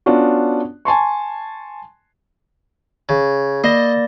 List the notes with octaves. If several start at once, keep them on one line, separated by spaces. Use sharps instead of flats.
B3 C#4 D4 F4 F#4
G#5 A5 C6 C#6
C#3
A#3 D5 D#5 A#6